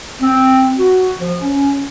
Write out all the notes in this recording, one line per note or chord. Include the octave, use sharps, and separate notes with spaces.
C4
F#4
F3
C#4